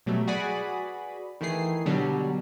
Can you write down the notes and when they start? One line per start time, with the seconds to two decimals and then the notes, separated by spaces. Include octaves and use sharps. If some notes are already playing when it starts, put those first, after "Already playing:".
0.06 B2 F#3 G3 A3
0.27 F#4 G#4 B4 D5 B5
1.41 D#3 E3 A3 G#4 C7
1.86 B2 D3 F#3 G3